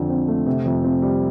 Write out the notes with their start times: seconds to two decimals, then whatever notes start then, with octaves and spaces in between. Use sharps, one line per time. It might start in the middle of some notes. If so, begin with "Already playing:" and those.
Already playing: F2 D3
0.10 C4
0.28 A3
0.46 C3
0.65 F2
0.84 C4
1.02 G3